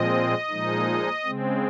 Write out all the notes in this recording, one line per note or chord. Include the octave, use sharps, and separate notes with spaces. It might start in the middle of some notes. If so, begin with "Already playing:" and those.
Already playing: A#2 F3 G#3 C4 D#5
A#2 F3 G#3 D#4
C#3 G#3 C4